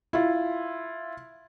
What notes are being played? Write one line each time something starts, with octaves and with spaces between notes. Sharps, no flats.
E4 F4